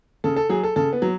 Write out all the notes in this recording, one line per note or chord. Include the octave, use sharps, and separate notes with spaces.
C#3 A4
A4
F#3 G#4
A4
C#3 A4
B3
F#3